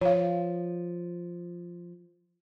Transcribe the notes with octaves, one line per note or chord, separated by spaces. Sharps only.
F3 C#5 F5